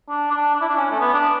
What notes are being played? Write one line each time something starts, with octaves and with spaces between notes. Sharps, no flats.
D4
D4
D4
E4
D4
C#4
A3
B3
D4